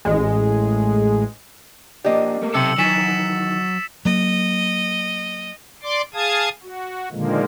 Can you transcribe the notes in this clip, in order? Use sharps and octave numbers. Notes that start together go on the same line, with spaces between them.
A1 G#3
A#3 D4 G4 D5 D#5
A3 A#3
B1 C3 A4 C5 E6 C#7 F#7
D#3 E3 F#3 G#5 A6 B6 E7
F#3 A#3 D#5
D5 C6 D6
G#4 F5 A5 D#6 G#6
F#4
A#2 D3 D#3 F3 G#3 A#3